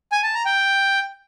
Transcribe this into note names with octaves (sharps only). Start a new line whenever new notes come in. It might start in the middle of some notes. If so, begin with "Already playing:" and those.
G#5
A5
A#5
G5